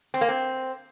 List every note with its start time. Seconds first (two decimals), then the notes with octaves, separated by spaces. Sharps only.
0.14 C4
0.21 A#3
0.29 C4